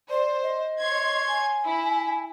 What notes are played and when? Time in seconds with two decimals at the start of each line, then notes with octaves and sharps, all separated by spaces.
0.10 C5 D5
0.43 D#5
0.79 C#5 C6 G#6
1.28 G#5
1.64 E4